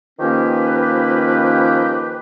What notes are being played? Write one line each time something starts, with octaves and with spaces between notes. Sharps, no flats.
D#3 F3 A#3 C#4 G4 B4